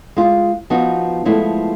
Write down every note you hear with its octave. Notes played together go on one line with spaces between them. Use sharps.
G#3 F4
F3 B3 D#4 F#4
F3 G#3 A3 B3 E4